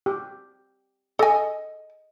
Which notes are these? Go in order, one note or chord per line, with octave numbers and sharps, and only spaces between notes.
G4
A4 D#5 G#5